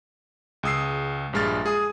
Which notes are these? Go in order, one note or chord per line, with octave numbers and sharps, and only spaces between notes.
C#2 G#4 D#6 E6 C7
A#1 G2 G#3 F6 A6
G#4 G#5 D#6